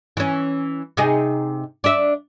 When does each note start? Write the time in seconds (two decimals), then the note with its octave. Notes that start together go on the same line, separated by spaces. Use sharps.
0.17 E3 C#4
0.97 C3 D#4 G#4
1.84 D4 E5